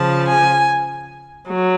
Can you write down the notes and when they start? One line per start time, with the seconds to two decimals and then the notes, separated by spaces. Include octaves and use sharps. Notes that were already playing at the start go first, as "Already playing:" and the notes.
Already playing: C#3 F3 A5
0.29 G#5
1.47 F#3